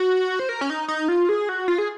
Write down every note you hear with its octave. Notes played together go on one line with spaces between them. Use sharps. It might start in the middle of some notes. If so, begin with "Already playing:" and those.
Already playing: F#4
C5
A#4
C#4
D#4
D#4
F4
G#4
F#4
F4
G#4